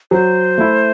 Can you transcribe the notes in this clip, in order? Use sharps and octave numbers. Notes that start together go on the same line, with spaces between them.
F#3 C5
A3 E4